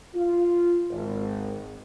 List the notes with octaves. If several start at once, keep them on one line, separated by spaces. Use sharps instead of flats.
F4
G#1